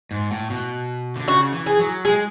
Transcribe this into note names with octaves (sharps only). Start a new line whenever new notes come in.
G#2
A2
B2
D3
C#3 F#4
E3
G#4
F#3
G#3 G#4